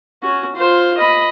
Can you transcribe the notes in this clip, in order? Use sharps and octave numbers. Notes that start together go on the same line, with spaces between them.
C#4 F#4
F4 C5
D#5 B5